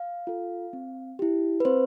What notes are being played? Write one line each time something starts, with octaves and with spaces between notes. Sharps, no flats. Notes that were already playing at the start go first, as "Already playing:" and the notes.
Already playing: F5
F4 A4
C4
E4 G4
B4
C4 C5